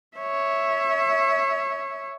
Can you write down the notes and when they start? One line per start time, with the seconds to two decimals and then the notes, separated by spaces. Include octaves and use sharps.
0.17 C#5 E5